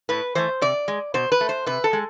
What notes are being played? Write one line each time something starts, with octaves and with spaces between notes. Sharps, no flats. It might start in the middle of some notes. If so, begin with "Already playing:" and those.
A2 B4
E3 A3 C5
C3 D5
G#3
B2 C5
B4
A3
C5
C3 B4
A4
G#3